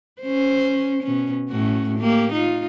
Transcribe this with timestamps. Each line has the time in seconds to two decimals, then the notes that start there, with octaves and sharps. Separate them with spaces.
0.22 C#4 C5
1.03 B2 C#4
1.49 A2 C#4 F#4
1.99 A#3 G4
2.33 D#4 F4